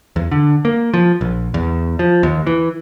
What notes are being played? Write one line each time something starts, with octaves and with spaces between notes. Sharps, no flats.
E2
D3
A#3
F3
A#1
E2
F3
D#2
E3